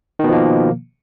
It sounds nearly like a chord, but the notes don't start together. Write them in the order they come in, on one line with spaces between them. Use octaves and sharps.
D#3 B2 F3 A#3